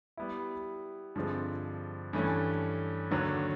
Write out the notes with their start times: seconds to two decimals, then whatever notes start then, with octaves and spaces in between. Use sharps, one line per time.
0.17 G3 B3 E4
1.15 G2 D3 F3 G#3 C4
2.13 G2 E3 A3 C#4
3.11 D#2 D3 F#3